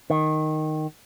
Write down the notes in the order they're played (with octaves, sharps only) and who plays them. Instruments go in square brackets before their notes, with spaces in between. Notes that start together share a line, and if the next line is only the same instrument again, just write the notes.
[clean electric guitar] D#3